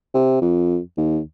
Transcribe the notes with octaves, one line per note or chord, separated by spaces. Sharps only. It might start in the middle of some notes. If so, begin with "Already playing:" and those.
C3
F2
D#2